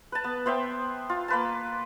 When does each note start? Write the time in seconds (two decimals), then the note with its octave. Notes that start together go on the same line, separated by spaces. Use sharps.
0.12 B4 A5
0.24 B3
0.46 B3 C5 E5 G5
1.10 F4
1.28 A#3 B4 A5